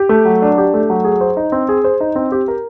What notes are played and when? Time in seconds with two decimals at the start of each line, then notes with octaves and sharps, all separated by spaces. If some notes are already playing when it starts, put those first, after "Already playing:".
Already playing: G4
0.09 A3
0.25 F#3
0.42 D4
0.58 G4
0.74 A3
0.90 F#3
1.05 G#4
1.21 C5
1.37 D#4
1.52 C4
1.69 G#4
1.84 C5
2.01 D#4
2.16 C4
2.32 G4
2.48 A#4